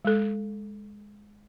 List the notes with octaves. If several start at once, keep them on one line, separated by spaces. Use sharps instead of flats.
G#3 A4